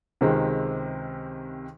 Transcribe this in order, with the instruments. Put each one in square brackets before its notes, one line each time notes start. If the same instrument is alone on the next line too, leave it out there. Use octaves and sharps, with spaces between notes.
[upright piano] C#2 C3 D#3 G#3 C4